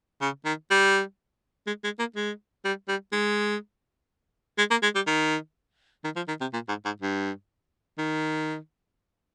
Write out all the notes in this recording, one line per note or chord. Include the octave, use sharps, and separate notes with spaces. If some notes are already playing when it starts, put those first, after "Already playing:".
C#3
D#3
G3
G#3
G#3
A#3
G#3
G3
G3
G#3
G#3
A#3
G#3
G3
D#3
D#3
F3
D#3
C3
A#2
G#2
G#2
G2
D#3